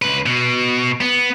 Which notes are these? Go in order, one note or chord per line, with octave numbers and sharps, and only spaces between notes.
C#2 B4
B2
B3